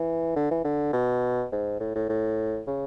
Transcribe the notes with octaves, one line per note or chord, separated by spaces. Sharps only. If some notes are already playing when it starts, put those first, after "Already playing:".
Already playing: E3
D3
E3
D3
B2
G#2
A2
A2
A2
C#3